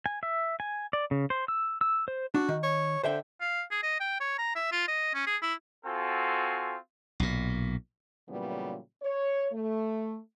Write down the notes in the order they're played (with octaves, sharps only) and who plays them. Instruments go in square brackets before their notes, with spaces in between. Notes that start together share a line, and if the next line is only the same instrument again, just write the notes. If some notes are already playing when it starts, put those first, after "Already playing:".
[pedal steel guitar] G#5
E5
G#5
D5
C#3
C5
E6
E6
C5
[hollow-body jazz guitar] D4 [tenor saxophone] F#4
[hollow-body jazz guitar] D#3
[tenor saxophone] C#5
[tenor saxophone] D3 [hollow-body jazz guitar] C5 E5 G5
[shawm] F5
G#4
D#5
G5
C#5
A#5
E5
F4
D#5
C#4
G#4
E4
[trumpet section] C4 F4 F#4 A4 G#5
[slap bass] B1 A#2
[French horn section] A#2 C#3 E3 F#3 G3 B3
C#5
A3